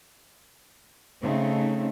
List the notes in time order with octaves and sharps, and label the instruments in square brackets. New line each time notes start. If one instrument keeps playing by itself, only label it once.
[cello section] C#3 A3 C4 D#4